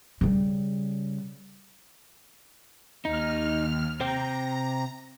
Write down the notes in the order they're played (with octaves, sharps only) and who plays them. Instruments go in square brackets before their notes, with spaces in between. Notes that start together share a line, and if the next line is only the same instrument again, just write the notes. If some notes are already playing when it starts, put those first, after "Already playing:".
[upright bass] C#3 G3
[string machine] D#2 F6 [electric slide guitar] D#4
[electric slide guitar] C3 C5 G5 [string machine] A#5